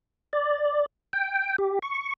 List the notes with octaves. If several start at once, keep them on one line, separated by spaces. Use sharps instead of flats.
D5
G5
G4
C#6